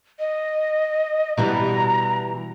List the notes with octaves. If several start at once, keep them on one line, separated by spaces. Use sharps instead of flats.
D#5
B2 E3 G3 A#5